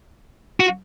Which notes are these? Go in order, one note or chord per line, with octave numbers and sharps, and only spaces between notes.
F#4